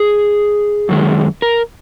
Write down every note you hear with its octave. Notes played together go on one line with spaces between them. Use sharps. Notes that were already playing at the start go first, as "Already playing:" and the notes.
Already playing: G#4
F#2 D#3 G#3
A#4